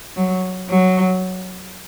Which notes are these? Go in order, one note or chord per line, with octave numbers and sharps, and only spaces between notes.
F#3
F#3